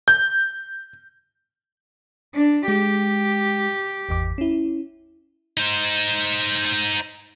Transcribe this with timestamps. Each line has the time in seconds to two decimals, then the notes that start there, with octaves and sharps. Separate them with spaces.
0.08 G6
2.35 D4
2.68 G#3 G4
4.09 G#1 E2 D6
4.38 C#4 E4
5.57 D#4 C5